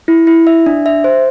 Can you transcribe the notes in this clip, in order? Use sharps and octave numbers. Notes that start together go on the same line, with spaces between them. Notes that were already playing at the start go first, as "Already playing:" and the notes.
E4
E4
E5
D4
E5
C5